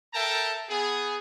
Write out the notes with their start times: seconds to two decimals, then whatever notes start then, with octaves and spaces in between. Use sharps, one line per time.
0.14 A4 A#4 E5 G5 A5 A#5
0.70 B3 G#4